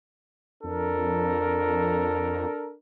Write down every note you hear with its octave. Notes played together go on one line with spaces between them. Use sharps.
F2 D4 A4 A#4